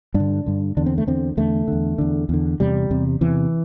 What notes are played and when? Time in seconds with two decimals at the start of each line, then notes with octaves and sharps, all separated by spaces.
0.14 G2 D4
0.20 D3
0.46 G2 D3
0.77 E2 D3 D4
0.86 C4
0.98 A3
1.07 E2 D3 C4
1.37 E2 D3 A3
1.68 E2 D3
1.98 E2 D3
2.29 E2 D3
2.60 E2 C3 G3
2.91 E2 C3
3.21 E2 C3 E3